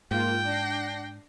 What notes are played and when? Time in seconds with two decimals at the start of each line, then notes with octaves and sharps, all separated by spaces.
0.11 G#2 A#3 F4 G5
0.44 D4 A#6 C7